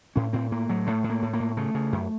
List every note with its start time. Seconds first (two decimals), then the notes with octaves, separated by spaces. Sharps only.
0.16 A2 C#4
0.33 A2 C4
0.52 A2 A#3
0.69 A2 F#3
0.87 A2 A3
1.04 A2
1.10 A#3
1.22 A2
1.33 A#3
1.40 A2
1.57 C#3 A3
1.75 C#3
1.92 F#2